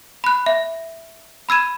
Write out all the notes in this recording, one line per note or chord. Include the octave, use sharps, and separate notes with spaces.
B5 F#6
E5
B5 E6 G#6 D#7 E7